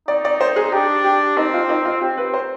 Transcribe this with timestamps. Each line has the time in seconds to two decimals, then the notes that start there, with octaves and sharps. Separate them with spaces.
0.08 D#4 D5
0.25 D5
0.41 C5
0.56 G#4
0.72 D4 G4
1.04 G4
1.37 C4 D#4
1.54 F4
1.69 D#4
1.85 F4
2.01 C4 G4
2.17 B4
2.34 C5